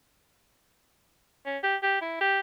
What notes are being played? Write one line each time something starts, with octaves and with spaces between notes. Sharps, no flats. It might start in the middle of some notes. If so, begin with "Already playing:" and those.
C#4
G4
G4
E4
G4